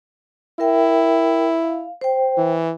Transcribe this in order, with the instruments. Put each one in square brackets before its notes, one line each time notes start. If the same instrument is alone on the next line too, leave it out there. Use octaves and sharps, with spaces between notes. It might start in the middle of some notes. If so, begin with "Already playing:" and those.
[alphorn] E4 [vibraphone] A#4 E5 G5
[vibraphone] F5
C5 G5
[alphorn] E3